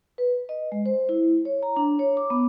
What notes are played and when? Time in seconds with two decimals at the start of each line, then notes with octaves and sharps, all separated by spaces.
0.18 B4
0.49 D#5
0.72 G#3
0.86 C5
1.09 E4
1.45 C#5
1.63 A#5
1.76 D4
1.99 C#5
2.17 D6
2.30 B3